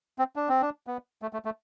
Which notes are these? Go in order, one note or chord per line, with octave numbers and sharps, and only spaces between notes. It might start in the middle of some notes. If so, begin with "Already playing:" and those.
C4
D4
C4
D4
B3
A3
A3
A3